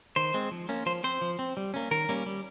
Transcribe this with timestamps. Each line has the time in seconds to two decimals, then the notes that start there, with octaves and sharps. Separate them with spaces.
0.16 D#3 C5
0.34 G#3 C4
0.51 F3
0.69 A#3 C#4
0.86 F3 C5
1.04 C4 C5
1.21 F3
1.39 C4
1.57 G3
1.74 A#3 C#4
1.91 D#3 A#4
2.09 G3 A#3 C#4
2.26 G3